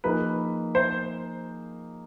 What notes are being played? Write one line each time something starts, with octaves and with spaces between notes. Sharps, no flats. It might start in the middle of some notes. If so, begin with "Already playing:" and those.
F3 A#3 D#4 G#4 B4
C5